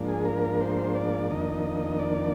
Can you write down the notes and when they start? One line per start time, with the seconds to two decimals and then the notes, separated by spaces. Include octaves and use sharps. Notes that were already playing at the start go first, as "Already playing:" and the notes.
Already playing: G#2 F3 A#3 D4
0.08 G#4
0.25 A#4
0.61 C5
0.95 D5
1.30 F2 D#3 A#3 D4 D#5
1.99 D5